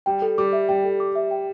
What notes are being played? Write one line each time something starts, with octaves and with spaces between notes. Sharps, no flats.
G3 G5
A4
G3 D6
E5
G3 G5
A4
D6
E5
G5